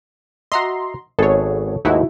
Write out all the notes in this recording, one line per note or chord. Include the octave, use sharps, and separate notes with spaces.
F#4 D#5 E5 A#5 C6
G#1 B3 G#4 A4 C#5
D#2 G#2 A3 D#4 E4 F#4